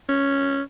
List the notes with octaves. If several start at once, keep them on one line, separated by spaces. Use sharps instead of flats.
C#4